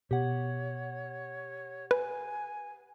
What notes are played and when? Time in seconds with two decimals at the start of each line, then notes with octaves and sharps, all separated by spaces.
0.11 B2 G4 C#5 F#5
1.91 B4 G#5